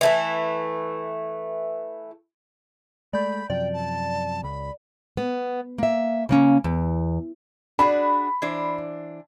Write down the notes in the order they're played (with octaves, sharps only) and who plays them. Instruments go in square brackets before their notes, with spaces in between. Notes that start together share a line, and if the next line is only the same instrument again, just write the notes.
[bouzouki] E3 A3 E4
[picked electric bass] G#3 A3 [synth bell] D5 G6 [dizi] B5
[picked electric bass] F#2 C3 F3 [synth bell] D5 [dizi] G5
[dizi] A5
[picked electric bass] C#2 [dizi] B5
[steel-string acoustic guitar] B3
A#3 E5
C#3 A#3 C#4
E2
[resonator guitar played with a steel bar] D4 F#4 G#4 [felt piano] B5
[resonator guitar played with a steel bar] E3 D4 C5